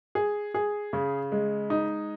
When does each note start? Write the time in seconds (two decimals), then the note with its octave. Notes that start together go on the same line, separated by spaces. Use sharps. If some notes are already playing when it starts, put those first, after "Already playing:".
0.15 G#4
0.54 G#4
0.93 C#3
1.32 G#3
1.70 D#4